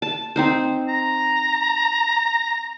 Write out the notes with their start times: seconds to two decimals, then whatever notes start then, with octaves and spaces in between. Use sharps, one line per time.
0.02 A5
0.36 C4 D#4 C5
0.88 A#5